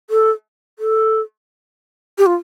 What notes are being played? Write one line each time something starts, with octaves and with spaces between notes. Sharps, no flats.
A4
A4
G4
F4